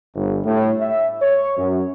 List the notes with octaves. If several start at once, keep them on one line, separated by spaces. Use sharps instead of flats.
G1
A2
E5
C#5
F#2